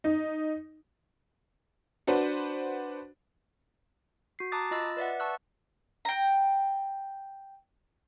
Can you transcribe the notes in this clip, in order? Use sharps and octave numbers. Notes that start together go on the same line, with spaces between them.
D#4
D4 F#4 B4 C5
F#4 C7
A5 A#5 D6 D#6 F#6 A6
F4 D#5 B5 E6 A6
B4 D5 E5 F#5
A5 C#6 E6 F#6
G5 A#5